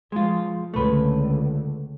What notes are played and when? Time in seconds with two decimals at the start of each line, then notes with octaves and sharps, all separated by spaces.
0.12 F3 G#3 F4
0.74 C#2 D3 A3 B4